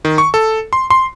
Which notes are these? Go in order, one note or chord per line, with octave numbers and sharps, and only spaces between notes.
D#3
C#6
A4
C6
C6